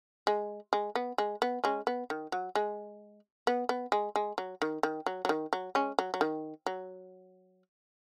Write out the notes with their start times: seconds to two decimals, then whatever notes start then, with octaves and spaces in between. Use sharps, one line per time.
0.27 G#3
0.73 G#3
0.95 B3
1.18 G#3
1.42 B3
1.64 G#3 C#4
1.87 B3
2.10 D#3
2.32 F#3
2.55 G#3
3.47 B3
3.69 B3
3.92 G#3
4.16 G#3
4.38 F#3
4.62 D#3
4.83 D#3
5.06 F#3
5.25 F#3
5.29 D#3
5.53 F#3
5.75 G#3 C#4
5.99 F#3
6.14 F#3
6.21 D#3
6.66 F#3